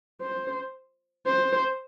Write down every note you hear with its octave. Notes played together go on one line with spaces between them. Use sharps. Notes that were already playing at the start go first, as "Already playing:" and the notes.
C5
C5